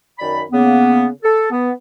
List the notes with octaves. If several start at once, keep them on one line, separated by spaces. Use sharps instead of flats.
F#2 D#3 D5 B5
C#3 A#3 B3
A4
B3